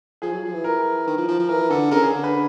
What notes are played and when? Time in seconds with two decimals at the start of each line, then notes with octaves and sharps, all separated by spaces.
0.22 F3 G#4
0.33 F#3
0.43 F3
0.54 E3
0.64 A#4
1.07 D#3
1.18 F3
1.28 F3
1.39 F3
1.49 E3 A#4
1.70 D3 A4
1.91 C#3 A#4
2.02 G#4
2.13 D3
2.24 B4